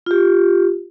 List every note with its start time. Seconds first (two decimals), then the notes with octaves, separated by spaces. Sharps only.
0.06 F4 G4